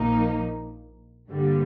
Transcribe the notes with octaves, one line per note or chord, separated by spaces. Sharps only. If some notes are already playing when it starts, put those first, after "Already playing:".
Already playing: A#1 A#2 F3 A#3 D#4
G2 D3 G3 A#3